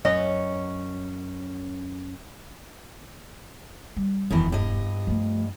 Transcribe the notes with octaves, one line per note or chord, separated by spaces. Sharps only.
F#2 C#4 D#5
G3
E1 F#2 B2 D#3 E3
G2 D#5
F3 A3